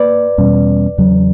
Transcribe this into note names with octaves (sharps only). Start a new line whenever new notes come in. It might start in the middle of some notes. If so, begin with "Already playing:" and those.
Already playing: A#3 B4 D5
E2 B2 G3 C#4
E2 C#3 F#3